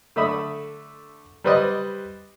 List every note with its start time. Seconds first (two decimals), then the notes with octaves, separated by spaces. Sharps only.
0.16 D3 A3 E5 B5 D#6
1.44 G3 B4 C5 D5 D#5